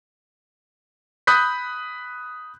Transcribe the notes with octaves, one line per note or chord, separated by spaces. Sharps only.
B5 D#6 F#6 G6 B6